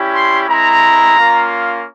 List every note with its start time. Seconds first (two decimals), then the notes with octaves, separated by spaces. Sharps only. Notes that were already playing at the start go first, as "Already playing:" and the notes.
Already playing: G3 C#4 E4 G4
0.13 C6
0.47 G#3 C4 E4 A#5
1.16 A#3 C#4 F4